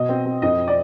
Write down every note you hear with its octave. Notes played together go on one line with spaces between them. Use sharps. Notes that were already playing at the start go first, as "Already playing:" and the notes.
Already playing: B2 D#5
C4
C4
F2 D#5
D5